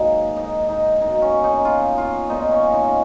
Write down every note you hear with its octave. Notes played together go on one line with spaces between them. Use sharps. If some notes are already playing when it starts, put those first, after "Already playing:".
Already playing: G#2 F#3 A#3 D#4
D#4
D#4
B2 A#3 D#4
C#4
D#4
F4
F4
A#2 G#3 B3 D#4
C#4
D#4